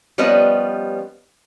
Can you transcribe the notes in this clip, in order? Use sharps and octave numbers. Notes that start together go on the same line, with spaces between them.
F3 G3 B3 C#4 B4 D#5